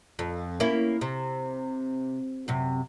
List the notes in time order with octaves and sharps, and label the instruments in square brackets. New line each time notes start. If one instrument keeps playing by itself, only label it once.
[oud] F2
A#3 C#4 E4
C3
F#2 C3